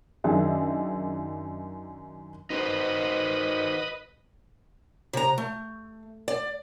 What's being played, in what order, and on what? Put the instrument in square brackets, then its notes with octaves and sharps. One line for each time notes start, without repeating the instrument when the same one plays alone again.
[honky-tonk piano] F#2 D#3 D4 G#4 E5
[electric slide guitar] D#4 F#4 C5 [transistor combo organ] B4 D#5
[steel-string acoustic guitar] C3 A#5
A3
D5